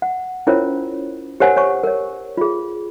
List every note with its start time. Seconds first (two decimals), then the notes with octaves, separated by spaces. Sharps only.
0.02 F#5
0.47 C#4 E4 F4 A#4 C5 C#5
1.40 G4 A#4 C5 C#5 F#5 G#5
1.57 C5 C#5 G#5 C#6
1.84 A#4 C#5
2.37 F4 G#4